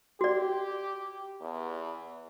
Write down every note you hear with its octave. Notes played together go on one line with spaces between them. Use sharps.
F#4 G4 D5
E2